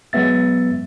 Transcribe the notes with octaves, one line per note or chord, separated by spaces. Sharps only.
F#3 G#3 B3 E5 A6